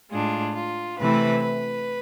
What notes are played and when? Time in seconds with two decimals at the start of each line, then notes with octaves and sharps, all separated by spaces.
0.12 A2 G#3 D4 F4
0.56 F4
0.99 C3 E3 A3 C4 E4 B4
1.43 B4